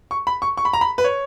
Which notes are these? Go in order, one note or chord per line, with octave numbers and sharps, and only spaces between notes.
C#6
B5
C#6
C#6
B5
A#5
B5
B4
C#5